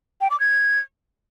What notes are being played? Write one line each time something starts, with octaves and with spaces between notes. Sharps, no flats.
G5
D6
G#6